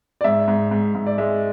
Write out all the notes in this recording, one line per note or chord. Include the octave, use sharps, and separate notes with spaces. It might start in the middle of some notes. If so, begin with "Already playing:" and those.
D5
G#2 E5
G#2
G#2
G#2
D5
G#3 E5